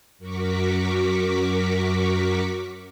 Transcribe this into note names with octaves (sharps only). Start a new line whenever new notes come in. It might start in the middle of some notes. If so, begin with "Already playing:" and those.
F#2 F#4 A#4 C#6 D6 B6